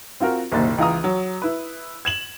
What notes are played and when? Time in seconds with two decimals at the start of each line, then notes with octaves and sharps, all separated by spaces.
0.20 C4 F4 F#4 A#4
0.52 F#1 C2 A#2 D#3 C5 A6
0.78 C#2 E3 F4 A#5 D#6
1.04 F#3
1.42 E4 B4
2.05 G#6 E7 F#7